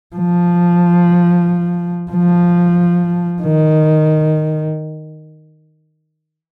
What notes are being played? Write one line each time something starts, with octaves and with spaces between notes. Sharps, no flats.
F3
F3
D#3